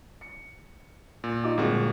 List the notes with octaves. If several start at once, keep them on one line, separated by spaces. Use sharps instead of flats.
C#7
A#2
D#4 F4 D6
G1 A#2 G#3 A#3 C4 F#4